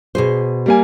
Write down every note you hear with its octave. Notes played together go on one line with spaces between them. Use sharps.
B2 G#4 C5
G3 A#3 G#5